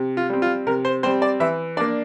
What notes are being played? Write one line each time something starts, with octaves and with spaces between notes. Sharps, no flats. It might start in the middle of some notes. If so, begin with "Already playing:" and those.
Already playing: C3
F4
G3 C4
F4
C3 A#4
C5
G3 C4 C5
D5
E3 E5
A#3 D4 D5